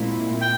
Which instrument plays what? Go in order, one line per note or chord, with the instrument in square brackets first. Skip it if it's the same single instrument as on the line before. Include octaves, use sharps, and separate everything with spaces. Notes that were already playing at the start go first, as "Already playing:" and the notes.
Already playing: [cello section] A#2 G#3 C4 E4
[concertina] G5